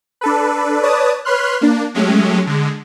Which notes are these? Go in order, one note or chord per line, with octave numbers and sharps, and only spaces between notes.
D4 A4 B4
B4 C#5 D5 A5 D#6
B4 C#5 B5 C6 F6 F#6
A#3 D4
F#3 G#3 A3 C#4 G4
D3 G#3